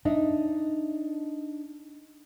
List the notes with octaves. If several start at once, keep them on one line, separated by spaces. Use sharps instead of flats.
D4 D#4 D#5 E5